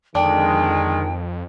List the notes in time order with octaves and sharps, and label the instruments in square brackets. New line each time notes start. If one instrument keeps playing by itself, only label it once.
[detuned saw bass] F2 [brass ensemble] D3 D#3 G#3 [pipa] D4 [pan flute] G5